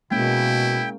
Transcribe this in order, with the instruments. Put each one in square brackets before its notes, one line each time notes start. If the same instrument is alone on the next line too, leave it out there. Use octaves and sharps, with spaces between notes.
[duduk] B2 [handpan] G#3 A#3 C#4 [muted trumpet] E4 [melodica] G5